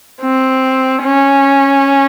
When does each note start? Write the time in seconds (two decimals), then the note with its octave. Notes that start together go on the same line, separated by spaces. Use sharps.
0.21 C4
1.04 C#4